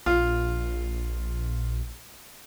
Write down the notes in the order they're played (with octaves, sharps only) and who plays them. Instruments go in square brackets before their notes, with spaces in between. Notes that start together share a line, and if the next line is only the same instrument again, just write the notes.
[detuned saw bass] A#1 [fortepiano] F4